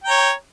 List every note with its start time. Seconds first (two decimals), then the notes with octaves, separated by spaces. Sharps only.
0.04 G5
0.07 A#5
0.10 C#5